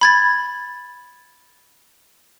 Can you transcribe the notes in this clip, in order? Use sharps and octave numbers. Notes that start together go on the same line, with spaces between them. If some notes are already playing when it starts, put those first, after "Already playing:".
B5 G#6 A6